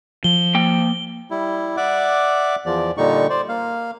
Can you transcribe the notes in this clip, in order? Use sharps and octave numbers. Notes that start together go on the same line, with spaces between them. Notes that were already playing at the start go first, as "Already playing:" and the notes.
F3 G7
A#3 G5
G3 E4
D5 E5 F#5 D6
E2 F3 D5
A#2 D3 G3 D#4 C#6
C5 D5
A#3 F5